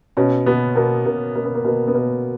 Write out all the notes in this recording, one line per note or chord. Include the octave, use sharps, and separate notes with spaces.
B2 C#4
B2 B3
B2 A#3
B2 A#3
B2 A#3
B3
A#3
B2 A#3
B3
B2 A#3